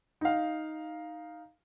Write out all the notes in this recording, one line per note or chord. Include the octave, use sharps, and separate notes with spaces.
D#4 F5